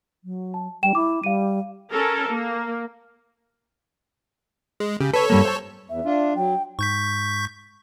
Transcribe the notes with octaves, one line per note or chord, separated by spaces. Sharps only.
F#3
A5
G3 G5 E7
E4 D6
G3 F5 D#7
C#4 A4 A#4
A#3
G#3
C#3 G4
A4 B4 C#5
G2 G3 A#3
C5 A5
E2 E5
D4 F4
F#3 G5
G#2 C#6 G6 B6